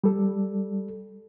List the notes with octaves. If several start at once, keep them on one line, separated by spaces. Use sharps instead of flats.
G3 A4